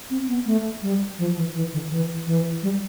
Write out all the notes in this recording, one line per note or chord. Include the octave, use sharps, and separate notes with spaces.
C4
B3
A3
G3
F3
E3
E3
D3
E3
E3
G3